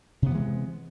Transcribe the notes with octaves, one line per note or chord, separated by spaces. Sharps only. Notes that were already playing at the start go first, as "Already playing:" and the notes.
C3 E3 G#3 B3